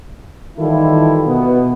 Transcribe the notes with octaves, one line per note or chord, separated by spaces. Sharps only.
D#3 E3 G3 E4 F4 A4
B2 B3